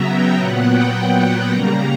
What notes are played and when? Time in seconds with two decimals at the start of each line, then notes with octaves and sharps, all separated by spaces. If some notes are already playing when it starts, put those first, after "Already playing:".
Already playing: C#3 F#3 B3 E5 A#5
0.09 G5
0.37 A#2 F#3 B3 F#5
0.66 G5
1.50 C#3 G3 A#3 A#5